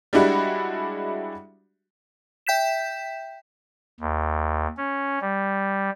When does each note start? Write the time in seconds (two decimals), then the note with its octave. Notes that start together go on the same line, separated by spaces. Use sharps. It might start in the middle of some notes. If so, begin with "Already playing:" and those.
0.13 G3 G#3 D4 E4 F#4
2.47 E5 G5 G6 B6 E7
4.00 D#2
4.77 C#4
5.21 G3